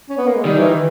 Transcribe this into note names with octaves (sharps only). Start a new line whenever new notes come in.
C#4
B3
A#3
G#3
D#3 G3
E3
E3